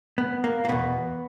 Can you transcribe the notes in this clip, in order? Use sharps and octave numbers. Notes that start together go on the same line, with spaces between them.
B3
A#3
A#3
E2 B2 B3